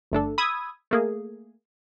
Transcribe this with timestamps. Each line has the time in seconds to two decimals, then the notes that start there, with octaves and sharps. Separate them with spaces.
0.12 G1 A3 D4 A4
0.38 B5 D#6 E6 G#6
0.91 A3 A#3 G#4